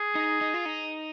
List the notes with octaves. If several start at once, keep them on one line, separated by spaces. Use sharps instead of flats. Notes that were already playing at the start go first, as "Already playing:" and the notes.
Already playing: G#4
D#4
D#4
F4
D#4